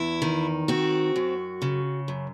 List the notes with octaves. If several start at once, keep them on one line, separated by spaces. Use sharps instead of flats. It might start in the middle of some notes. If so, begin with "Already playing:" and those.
Already playing: E2 E4
D#3
C4 F#4
F#2
C#3
F#2